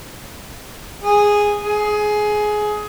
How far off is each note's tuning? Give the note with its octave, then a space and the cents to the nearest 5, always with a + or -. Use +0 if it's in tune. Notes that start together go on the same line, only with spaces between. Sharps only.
G#4 -5
G#4 +15